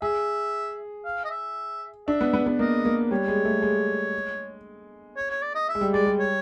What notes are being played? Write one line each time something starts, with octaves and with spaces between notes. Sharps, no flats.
G#4 E5
F5
D#5
E5
D4 E5
B3
B3
B3
A#3 D#5
A#3
G3 C#5
G#3
A3
G#3
C#5
C#5
D5
D#5
E5
G#3
G3
G#3 D5
G3
C#5